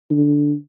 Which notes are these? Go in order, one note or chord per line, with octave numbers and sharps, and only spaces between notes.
D3